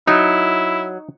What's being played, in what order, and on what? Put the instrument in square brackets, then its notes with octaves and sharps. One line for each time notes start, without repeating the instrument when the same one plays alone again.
[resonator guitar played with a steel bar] F#3 [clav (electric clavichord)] D#4 [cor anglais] E4